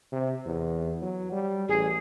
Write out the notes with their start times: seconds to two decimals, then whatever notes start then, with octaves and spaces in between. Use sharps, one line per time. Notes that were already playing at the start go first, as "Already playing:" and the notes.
0.12 C3
0.45 E2
1.02 F#3
1.32 G3
1.69 A1 G#4